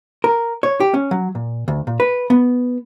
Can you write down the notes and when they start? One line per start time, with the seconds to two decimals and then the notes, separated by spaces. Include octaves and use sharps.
0.24 A#4
0.63 C#5
0.80 G4
0.94 C#4
1.11 F#3
1.35 A#2
1.68 D2
1.87 A#2
2.00 B4
2.30 B3